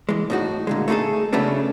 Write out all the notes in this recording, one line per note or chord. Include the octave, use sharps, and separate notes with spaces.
E3 G#3
A2 D#4 F#4
A#2 D3 G#3
A3 D#4 E4 G#4 A4
C#3 F#3 A3 B3 C#4 D4